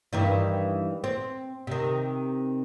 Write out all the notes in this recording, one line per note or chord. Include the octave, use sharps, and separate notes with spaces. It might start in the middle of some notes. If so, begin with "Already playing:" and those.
G2 D#3 E3
C4
C3 D#3